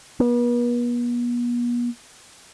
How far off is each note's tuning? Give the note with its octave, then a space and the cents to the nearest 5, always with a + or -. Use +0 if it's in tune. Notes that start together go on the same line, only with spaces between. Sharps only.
B3 -40